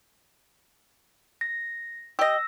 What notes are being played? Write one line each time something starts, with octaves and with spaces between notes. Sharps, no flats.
A#6
G4 D#5 E6 A#6